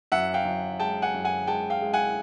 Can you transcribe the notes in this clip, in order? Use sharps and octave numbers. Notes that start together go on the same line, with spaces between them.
F#2 E5 F#5
F5 G5
F#2
G#3 G5 A5
F#5 G#5
F#2
F#5 G#5
G#3 G5 A5
F5 G5
G#3
F#5 G#5